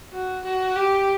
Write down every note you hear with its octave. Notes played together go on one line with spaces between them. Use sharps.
F#4
F#4
G4